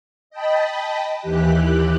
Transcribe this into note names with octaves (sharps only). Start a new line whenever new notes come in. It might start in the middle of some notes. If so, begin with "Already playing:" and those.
D#5 G5 A5 B5
D#2 E3 G4 F#6